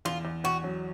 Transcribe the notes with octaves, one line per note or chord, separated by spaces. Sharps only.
E2 F4
E2
E2 F#4
F#3